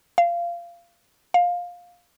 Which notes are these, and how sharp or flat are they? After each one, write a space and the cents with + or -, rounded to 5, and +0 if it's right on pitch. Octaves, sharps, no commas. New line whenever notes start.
F5 -20
F5 +15